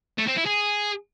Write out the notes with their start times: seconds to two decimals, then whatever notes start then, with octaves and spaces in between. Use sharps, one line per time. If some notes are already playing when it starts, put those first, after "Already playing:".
0.18 A3
0.28 C4
0.37 E4
0.46 G#4